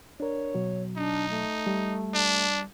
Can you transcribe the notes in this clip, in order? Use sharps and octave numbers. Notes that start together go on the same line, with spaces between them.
D4 A#4 C#5
B2 F#3
D4 D#4
A3
G3
D4